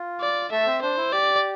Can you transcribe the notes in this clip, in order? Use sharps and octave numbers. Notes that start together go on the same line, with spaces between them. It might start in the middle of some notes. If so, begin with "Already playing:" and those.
Already playing: F4
D5
A3 A4 E5
C4 C5
D4 C5
E4
G4 D5